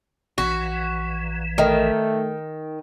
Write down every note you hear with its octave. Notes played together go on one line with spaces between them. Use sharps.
A#1 E3 F#4
D#3 A3 A#4 B4 D#5